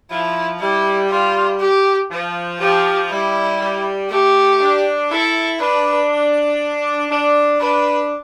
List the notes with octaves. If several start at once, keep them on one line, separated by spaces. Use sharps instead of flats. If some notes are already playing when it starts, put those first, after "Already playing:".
F3 E4
G3 E4
G3 F4
G4
F3
F3 G4
G3 E4
G3
A3 G4
D4
E4 A4
D4 B4
D4
D4 B4